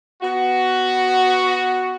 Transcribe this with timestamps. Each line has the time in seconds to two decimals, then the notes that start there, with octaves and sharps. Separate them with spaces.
0.22 B3 F#4